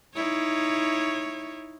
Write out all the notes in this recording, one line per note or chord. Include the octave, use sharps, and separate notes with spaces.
D#4 E4 C#5